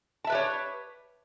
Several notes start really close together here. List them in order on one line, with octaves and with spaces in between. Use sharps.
A5 E5 B4 G4 C#5